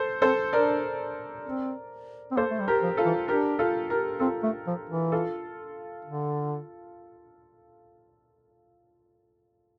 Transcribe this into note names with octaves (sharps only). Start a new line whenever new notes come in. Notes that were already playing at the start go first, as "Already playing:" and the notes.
Already playing: A4 C5
C4 A4 C5
D4 A#4 D5
C4
C4
A#3 A4 C5
A3
G3
G4 A#4
F3
F4 A4
E3
D4 G4 A#4
F4 A4
G4 A#4
C4 F4 A4
A3
F3
E3
F4 A4
D3